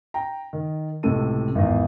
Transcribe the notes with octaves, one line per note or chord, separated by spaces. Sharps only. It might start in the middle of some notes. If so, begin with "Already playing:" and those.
G5 A#5
D#3
C#2 A2 C3 A4 D#7
G#1 E2